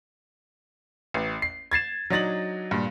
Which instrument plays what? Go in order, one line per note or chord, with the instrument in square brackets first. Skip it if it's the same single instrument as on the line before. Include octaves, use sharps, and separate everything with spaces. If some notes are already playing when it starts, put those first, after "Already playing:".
[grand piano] A1
C7
G#6 A6 C7 E7
F#3 D4 D#4 A6 A#6 F#7
G2 A#2